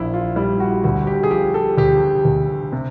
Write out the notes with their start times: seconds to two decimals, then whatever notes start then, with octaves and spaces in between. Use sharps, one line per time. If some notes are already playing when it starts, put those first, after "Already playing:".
Already playing: A#1 E4
0.14 F4
0.36 G3 E4
0.60 F#4
0.84 D2 F#4
1.07 G4
1.23 G#4
1.30 F3 G4
1.54 A4
1.78 D2 G4
2.25 D2
2.72 C3